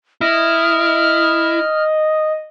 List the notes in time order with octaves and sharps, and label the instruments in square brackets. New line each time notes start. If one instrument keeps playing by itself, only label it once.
[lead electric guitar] E4 [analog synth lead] D#5 [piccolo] F6